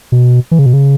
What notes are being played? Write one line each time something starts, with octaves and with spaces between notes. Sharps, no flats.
B2
E3
C#3
B2
C#3